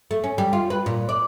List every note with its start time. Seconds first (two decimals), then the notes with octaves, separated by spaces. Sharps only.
0.11 A3
0.24 C#4
0.38 G3
0.53 F4
0.70 B4
0.86 A#2
1.09 D5